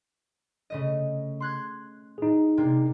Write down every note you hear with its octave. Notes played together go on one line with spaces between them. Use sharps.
C#3 A3 D#5
C6 F#6 G#6
D#4 G#4
C3 A#3 D4